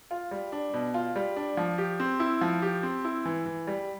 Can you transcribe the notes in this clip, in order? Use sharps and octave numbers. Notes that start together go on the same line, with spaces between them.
F4
G3
D4
B2
F4
G3
D4
F3
G4
C4
E4
F3
G4
C4
E4
E3
E3
G3